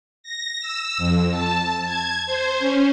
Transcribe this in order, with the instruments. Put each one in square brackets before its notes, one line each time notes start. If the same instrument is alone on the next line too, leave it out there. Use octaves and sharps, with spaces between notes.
[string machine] A#6
E6
F2
A5
G#6
C5
C#4